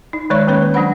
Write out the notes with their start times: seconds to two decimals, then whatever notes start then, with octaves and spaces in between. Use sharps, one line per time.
0.13 D#4
0.30 D#3 G#3 C#5 D5 C#6
0.47 D#3 G#3 A#3 C#4 B4 C#5
0.62 B4
0.74 F#3 D4 C5 F#5 B5